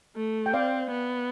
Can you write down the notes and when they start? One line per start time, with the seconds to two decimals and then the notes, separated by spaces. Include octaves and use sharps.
0.16 A3
0.46 G5
0.53 C4 D5 F5
0.91 B3